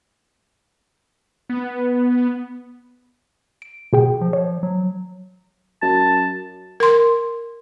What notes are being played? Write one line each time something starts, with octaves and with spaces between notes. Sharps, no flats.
B3
D7
B2 G#4 G5
F3
C#5
F#3
F#2 A5
A#4 C6